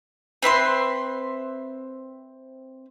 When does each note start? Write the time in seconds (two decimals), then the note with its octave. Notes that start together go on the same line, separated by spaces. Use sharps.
0.42 C4 B4 E5 C6